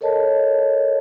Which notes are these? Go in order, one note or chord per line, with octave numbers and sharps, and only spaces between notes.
A4 A#4 C#5 D#5 A5